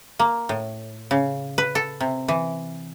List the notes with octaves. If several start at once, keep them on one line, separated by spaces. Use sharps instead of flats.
A#3
A2
C#3
B4
A4
C3
E3